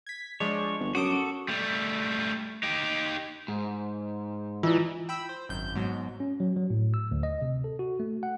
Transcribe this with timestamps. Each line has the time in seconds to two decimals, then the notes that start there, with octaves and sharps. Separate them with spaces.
0.06 G#6 B6
0.40 F3 G#3 D4 C#5
0.80 G1
0.95 F#2 F#4 A4 D6 D#6 D7
1.48 G3 A3
2.63 D#4 G4
3.48 G#2
4.63 E3 E4 F4
5.09 G5 B5 E6
5.29 C5
5.49 G#1 F#2 G6
5.75 G#2 B2 F#3
6.20 C#4
6.40 F#3
6.57 F#3
6.70 A2
6.94 E6
7.11 D2
7.23 D#5
7.42 C3
7.64 A4
7.79 F#4
8.00 A3
8.23 F#5